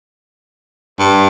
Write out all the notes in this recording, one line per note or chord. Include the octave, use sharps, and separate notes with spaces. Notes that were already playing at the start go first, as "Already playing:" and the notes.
G2